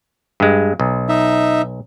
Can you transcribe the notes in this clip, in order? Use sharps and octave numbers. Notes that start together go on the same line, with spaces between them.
G2 G#3
B1
D#4 E5